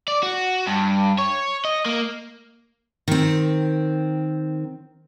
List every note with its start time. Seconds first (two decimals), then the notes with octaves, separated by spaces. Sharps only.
0.08 D5
0.23 F#4
0.67 G2
1.19 C#5
1.65 D#5
1.85 A#3
3.08 D#3 C4